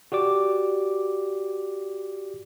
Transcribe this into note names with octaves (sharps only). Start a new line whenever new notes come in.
F#4 G4 D5 D6